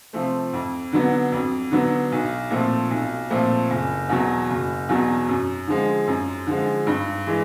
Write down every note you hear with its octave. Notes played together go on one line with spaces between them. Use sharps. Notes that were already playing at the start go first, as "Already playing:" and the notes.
C3 F3 A3 C4
F2
D3 F#3 B3 D4
F2
D3 F#3 B3 D4
B1
A#2 F3 A3 C4
B1
A#2 F3 A3 C4
F#1
E2 B2 F#3
F#1
E2 B2 F#3
F#2
D3 F3 G#3
F#2
D3 F3 G#3
G2
E3 G#3